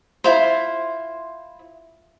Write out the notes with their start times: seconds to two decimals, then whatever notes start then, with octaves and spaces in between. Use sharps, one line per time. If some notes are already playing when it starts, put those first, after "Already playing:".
0.24 E4 F4 C5